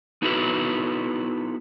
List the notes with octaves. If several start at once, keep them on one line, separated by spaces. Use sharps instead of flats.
B3 D#4 E4 F#4 A4 B4